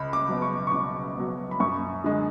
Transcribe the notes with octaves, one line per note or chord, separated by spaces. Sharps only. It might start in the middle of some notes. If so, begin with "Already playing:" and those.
Already playing: C#2 B5
D6
B2 F#3
C#6
C#6
C#2 D6
B2 F#3
B5
F#2 C#6
D3 G#3